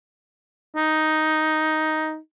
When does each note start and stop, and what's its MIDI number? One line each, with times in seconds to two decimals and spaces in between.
0.76 2.17 63